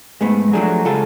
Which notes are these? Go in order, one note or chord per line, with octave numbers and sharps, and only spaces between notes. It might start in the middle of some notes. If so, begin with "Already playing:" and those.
G#2 G#3 A3 B3
F3 F#3 A3 D4 G#4
C#3 G#3 C#4 F4 A4